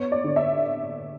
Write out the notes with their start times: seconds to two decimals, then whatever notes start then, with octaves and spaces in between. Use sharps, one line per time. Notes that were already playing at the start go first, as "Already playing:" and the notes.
Already playing: B3 C#5
0.12 D5
0.24 D3
0.36 E5